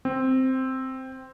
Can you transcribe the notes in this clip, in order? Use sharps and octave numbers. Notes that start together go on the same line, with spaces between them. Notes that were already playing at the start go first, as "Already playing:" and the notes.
C4